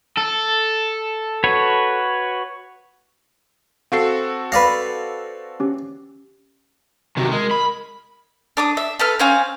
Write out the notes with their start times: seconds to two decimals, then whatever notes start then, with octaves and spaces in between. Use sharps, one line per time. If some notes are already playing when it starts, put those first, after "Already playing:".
0.18 A4
1.44 F#4 B4 C#5
3.92 C4 F#4 A4 F5 C7
4.52 B4 D5 F5 B5 A#6
5.60 C#4 G4
7.17 C3 D#3 F#4
7.32 G#3 A#4
7.51 B5
8.57 D4 D6 D#6
8.77 E5
8.99 A4 B4 F6
9.19 C4 C#4 F5 G#5